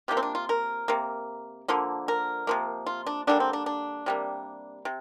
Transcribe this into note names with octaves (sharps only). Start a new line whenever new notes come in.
C3 F3 A#3 G4
C4
D4
F4
A#4
C3 A#3
D3 F3 A#3
A#4
C3 F3 A#3
F4
D4
D3 G3 A#3 D4
C4
D4
D4
C3 G3 A#3
C3